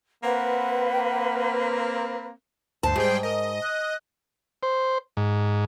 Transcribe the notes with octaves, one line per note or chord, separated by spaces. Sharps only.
A#3 C4 B4 F#5
D2 G2 C5 A5
G#2 G3 G#4 G5
A#4 D#5
F#6
C5
G#2